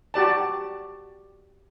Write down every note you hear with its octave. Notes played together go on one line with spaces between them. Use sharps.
F#4 G4 D5 A5